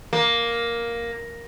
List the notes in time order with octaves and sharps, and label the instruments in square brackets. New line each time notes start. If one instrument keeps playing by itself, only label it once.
[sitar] A#3